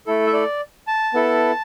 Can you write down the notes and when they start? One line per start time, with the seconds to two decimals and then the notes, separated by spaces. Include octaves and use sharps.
0.07 A3 E4 A4
0.27 E5
0.33 D5
0.87 A5
1.14 B3 E4 A4